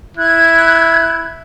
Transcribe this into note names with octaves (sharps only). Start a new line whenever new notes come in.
E4 F#6 G#6